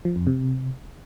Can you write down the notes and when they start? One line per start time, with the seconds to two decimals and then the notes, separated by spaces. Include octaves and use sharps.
0.05 F3
0.16 F2
0.27 C3